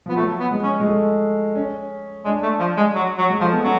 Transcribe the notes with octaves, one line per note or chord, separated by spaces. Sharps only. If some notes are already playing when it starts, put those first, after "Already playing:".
F3 B3
F#3 A3
B3
G#3
C#4
G#3
A3
C#4
G#3 D4
A3
F3
G#3
F#3
F#3
G#3
F3 A3
B3
F#3 C#4